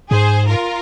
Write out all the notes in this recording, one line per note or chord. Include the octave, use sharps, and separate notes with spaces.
G#2 G#4 C5
F4 A#4